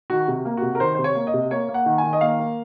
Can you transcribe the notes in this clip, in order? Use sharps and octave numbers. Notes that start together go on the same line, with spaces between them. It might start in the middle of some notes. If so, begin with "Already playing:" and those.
D#3 F#4
C3
A#3
C3 F#4
A#4
D#3 C5
C3 C5
C#5
A#3
D#5
C3
A#3 C#5
A#3
F#5
D#3
G#5
D#3
D#5
A#3 F5
A#3